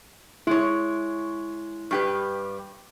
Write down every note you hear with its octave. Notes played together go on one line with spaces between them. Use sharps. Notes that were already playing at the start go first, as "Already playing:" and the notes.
G#3 E4 C#5
G2 G4 B4